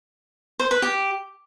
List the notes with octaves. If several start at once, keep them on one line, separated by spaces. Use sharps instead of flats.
C5
B4
G4